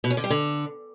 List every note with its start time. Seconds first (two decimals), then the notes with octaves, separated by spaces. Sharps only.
0.04 B2
0.11 C#4
0.17 D3
0.24 G3
0.30 D3